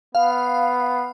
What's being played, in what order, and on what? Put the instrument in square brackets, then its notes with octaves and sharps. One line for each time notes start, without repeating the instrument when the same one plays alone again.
[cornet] B3 [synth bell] F5